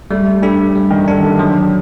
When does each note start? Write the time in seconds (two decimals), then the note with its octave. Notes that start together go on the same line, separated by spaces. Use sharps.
0.11 G3 A3
0.42 G3 D4 A4
0.75 G3
0.90 D#3
1.08 D#3 D4
1.11 A4
1.23 D3
1.39 D3 F#3